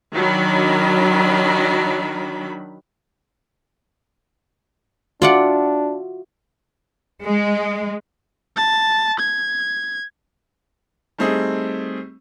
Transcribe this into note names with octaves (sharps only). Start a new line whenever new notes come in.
D#3 F#3 D4 B5
D4 F4 F#4 D5 E5 F#5
G#3
A5
G#6
G3 A3 C4 D#4 G#4